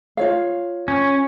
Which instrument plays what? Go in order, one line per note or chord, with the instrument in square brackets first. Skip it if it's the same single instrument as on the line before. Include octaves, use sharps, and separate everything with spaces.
[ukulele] F4 C#5 F5
[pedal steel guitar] C#4